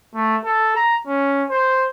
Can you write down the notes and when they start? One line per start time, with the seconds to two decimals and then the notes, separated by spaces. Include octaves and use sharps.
0.15 A3
0.45 A4
0.76 A#5
1.07 C#4
1.50 C5